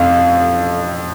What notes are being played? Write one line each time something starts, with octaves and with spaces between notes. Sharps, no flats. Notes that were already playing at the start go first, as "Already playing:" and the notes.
Already playing: F2 F5